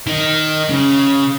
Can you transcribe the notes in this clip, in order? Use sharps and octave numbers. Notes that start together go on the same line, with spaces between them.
D#3
C#3